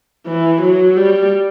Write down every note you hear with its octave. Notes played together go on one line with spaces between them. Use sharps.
E3
F#3
G3